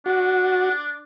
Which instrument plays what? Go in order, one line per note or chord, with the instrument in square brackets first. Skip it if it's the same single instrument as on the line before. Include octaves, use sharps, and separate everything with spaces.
[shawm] D4 [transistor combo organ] F#4